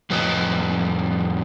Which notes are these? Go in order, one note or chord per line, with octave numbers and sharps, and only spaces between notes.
F2 A2 B4 D#5